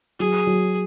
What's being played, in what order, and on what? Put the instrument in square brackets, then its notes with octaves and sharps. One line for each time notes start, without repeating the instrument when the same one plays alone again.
[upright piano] F#3 [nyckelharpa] G#4
[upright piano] F#3